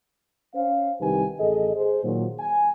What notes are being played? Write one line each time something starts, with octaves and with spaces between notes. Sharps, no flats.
C#4 C5 F5
C2 D#3 D#4 G4 B4 G#5
A1 G#4 A4 D#5
G#4 C5
A#2 D#3 F#3
G#5